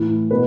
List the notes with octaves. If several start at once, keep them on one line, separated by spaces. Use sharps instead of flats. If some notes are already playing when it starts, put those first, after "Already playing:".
Already playing: A2 E3
B2 B4